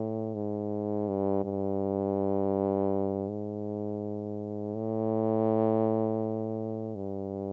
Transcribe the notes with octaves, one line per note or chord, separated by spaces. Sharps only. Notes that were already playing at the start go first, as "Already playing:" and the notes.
Already playing: A2
G#2
G2
G2
G#2
A2
G2